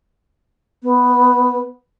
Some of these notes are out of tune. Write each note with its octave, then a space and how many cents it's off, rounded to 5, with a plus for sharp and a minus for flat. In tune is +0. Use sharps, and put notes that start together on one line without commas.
B3 +0